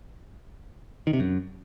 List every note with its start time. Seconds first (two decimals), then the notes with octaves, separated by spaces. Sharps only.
1.07 D#3
1.13 C3
1.20 F#2